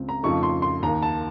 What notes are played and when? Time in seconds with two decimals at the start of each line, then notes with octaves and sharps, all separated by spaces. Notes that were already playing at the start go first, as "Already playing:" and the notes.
Already playing: C#2 C#3 C4
0.09 A#5
0.23 F2 C#3 F3 A3 D#4 C#6
0.43 C6
0.62 C6
0.83 D#2 D#3 A#3 A#5
1.02 A5